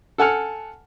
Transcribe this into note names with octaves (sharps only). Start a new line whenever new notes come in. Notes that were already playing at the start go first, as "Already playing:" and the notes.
A4 F#5 G#5 F6